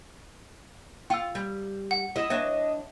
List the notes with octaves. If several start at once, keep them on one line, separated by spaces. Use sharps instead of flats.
F4 G5 E6
G3
F#5
E4 D#5
D4 B4 C#5 E5